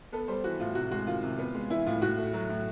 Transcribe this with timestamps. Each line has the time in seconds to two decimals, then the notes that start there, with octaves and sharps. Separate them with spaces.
0.12 B3 A4
0.28 G3 C5
0.44 E3 F#4
0.60 A2 F4
0.75 C3 F#4
0.91 G#3 F#4
1.07 D#3 F4
1.22 C3
1.38 B3
1.55 G#3
1.70 E3 E4
1.86 A2 F4
2.02 A2 F#4
2.18 A3
2.33 F#3
2.49 A2